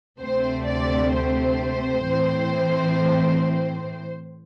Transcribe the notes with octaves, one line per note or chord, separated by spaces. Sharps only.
D2 C3 A3 C4 C5
D5
C5
A2 E3 C4